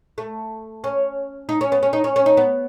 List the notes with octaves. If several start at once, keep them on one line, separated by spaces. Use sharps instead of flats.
A3
C#4
D#4
C#4
B3
C#4
D#4
C#4
C#4
D#4
B3